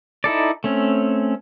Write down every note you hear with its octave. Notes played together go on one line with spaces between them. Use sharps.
D#4 E4 A4 D5
A3 C4 C#4